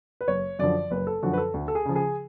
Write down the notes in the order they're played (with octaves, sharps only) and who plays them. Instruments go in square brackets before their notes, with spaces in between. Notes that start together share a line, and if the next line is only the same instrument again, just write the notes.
[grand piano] B4
F#1 C#5
F#2 D3 F3 D5
F#1 B4
A4
F#2 D3 F3 F#4
B4
A4
D2
A4
G#4
C#3 F3
G#4